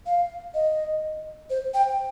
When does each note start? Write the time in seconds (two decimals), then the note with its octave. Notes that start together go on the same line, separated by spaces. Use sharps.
0.06 F5
0.54 D#5
1.50 C5
1.74 G5